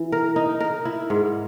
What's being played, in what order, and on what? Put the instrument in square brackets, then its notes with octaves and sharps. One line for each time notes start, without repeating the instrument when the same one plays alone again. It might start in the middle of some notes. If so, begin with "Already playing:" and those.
Already playing: [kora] E3
A#4
D#4
A#4
E4
G#2